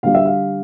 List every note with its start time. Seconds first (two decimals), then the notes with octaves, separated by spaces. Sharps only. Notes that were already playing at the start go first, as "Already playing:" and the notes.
0.03 D3 G3 F5
0.15 E5
0.25 F5